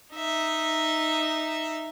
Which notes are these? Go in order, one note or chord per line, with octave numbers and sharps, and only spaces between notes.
D#4 E5